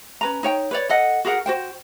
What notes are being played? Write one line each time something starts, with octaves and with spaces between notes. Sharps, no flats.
C#4 B4 A#5
D#4 C#5 G5
B4 C#5 D5
A4 D#5 F#5
F#4 G#4 A#4 F#5
F#4 C5 G5